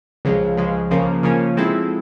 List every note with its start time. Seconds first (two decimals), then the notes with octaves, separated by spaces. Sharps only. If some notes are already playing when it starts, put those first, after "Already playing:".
0.25 C#2 C#3 F3 G#3
0.57 C#2 C#3 F3 G#3
0.91 C#3 F3 A#3 C#4
1.23 C#3 F3 A#3 C#4
1.57 F3 G#3 C4 E4 A4